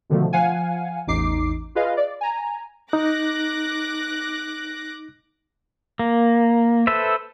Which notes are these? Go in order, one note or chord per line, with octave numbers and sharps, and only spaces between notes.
B2 D3 D#3 F3 A3
F3 F5 F#5 G#5
A1 E2 D#4 D6 C7
F4 G#4 B4 D#5 F5
D5
G#5 A#5
D#4 D6 F#6 A#6
A#3
A4 B4 C5 E5